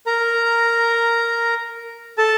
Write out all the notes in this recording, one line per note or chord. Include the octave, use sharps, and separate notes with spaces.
A#4 A#5
A4 A5